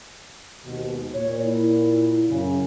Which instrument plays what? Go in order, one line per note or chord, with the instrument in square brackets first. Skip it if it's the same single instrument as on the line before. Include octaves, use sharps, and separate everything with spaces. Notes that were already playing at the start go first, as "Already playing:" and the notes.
[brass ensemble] D#2 G#2 B2
[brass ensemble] A#2 [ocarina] C#5
[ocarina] E4
[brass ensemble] F#2 C#3